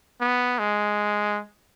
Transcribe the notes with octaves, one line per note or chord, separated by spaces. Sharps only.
B3
G#3